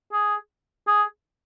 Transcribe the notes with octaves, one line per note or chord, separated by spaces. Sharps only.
G#4
G#4